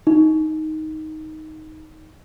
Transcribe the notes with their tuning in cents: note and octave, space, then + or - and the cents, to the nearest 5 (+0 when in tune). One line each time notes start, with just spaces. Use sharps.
D#4 +5